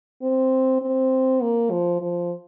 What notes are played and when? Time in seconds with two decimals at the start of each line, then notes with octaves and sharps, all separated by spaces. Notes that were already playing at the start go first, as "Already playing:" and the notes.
0.22 C4
0.82 C4
1.42 A#3
1.71 F3
2.01 F3